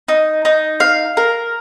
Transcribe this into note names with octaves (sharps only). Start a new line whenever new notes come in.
D#4
D#4
F5
A#4